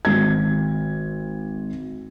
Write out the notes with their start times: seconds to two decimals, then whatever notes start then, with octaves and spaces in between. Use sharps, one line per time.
0.05 G#1 G#6